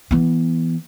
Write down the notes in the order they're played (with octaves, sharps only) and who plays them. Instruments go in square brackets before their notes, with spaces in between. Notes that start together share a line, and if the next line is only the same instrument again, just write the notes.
[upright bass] E3 B3